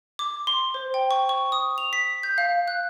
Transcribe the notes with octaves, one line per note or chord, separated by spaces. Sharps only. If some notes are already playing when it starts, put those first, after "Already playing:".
D6
C6
C5
G5
C#6
C#6
D#6
F7
B6
G6
F5
F#6